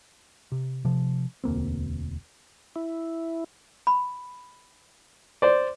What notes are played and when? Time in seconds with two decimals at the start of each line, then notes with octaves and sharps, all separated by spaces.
0.52 C3
0.85 C3 F3
1.44 E1 D2 A#3 C4
2.76 E4
3.87 B5
5.42 C5 D5